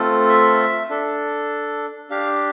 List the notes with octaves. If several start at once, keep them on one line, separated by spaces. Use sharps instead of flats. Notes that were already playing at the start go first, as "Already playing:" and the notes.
Already playing: A3 C4 F4 A4
E5
D4 A4
D4 G4 F5